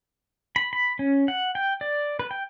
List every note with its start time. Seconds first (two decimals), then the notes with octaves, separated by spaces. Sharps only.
0.56 B5
0.73 B5
0.99 C#4
1.28 F#5
1.55 G5
1.81 D5
2.19 B4
2.31 G5